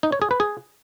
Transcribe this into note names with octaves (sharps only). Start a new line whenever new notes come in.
D#4
C#5
G#4
B4
G#4